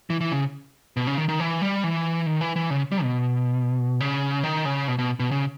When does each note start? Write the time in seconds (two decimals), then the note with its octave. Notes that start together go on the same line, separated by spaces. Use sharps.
0.10 E3
0.21 E3
0.32 C#3
0.97 B2
1.07 C#3
1.18 D#3
1.29 D#3
1.40 E3
1.62 G3
1.84 E3
2.26 D#3
2.41 E3
2.56 E3
2.70 C#3
2.92 G3
3.03 B2
4.00 C#3
4.43 D#3
4.65 C#3
4.88 B2
4.99 B2
5.20 B2
5.31 C#3